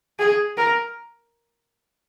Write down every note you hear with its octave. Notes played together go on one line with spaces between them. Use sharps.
G#4
A#4